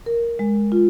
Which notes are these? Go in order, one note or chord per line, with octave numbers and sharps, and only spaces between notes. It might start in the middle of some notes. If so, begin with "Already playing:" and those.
A#4
G#3
F4